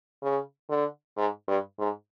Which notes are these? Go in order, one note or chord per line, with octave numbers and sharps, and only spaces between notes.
C#3
D3
G#2
G2
G#2